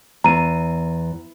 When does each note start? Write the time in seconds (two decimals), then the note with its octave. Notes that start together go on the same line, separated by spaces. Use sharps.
0.24 E2 A#5 D#7